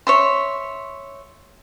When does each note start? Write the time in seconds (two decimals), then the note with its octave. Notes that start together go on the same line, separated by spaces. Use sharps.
0.07 C#5 E5 C6